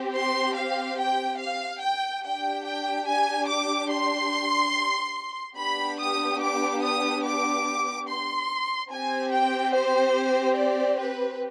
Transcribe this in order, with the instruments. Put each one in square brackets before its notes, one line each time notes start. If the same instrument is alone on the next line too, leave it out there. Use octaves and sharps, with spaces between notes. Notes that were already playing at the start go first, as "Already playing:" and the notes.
Already playing: [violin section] C4 G4
C6
F5
G5
F5
G5
D4 G4 G5
G5
G#5
D6
C6
B3 D4 G4 B5
D#6
D6
D#6
D6
C6
C4 G4 G#5
G5
C5
D5
B4